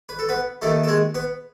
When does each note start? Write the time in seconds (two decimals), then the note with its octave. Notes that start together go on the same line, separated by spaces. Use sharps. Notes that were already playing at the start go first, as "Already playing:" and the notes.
0.09 B4
0.19 A4
0.29 B3 B4
0.62 D#2 D#3 A3 A4
0.84 A4
0.88 G#3 G#4
1.15 B3 B4